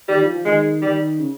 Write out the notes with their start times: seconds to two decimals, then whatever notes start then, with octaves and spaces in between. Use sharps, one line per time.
0.09 D#3 G3
0.21 F3
0.34 F3
0.46 D#3 G#3
0.82 D#3 G3
1.19 C#3